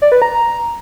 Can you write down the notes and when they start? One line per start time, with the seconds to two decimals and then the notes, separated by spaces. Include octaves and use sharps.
0.02 D5
0.12 B4
0.22 A#5